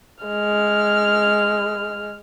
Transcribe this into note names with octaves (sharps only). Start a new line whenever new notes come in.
G#3 F6